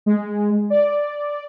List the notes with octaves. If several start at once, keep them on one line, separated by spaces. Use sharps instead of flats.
G#3
D5